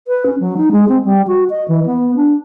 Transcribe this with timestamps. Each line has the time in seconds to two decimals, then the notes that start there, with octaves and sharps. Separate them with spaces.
0.08 B4
0.26 C#4
0.40 F#3
0.57 D#4
0.72 G#3
0.89 C4
1.05 G3
1.27 F#4
1.50 D#5
1.68 E3
1.86 B3
2.16 D4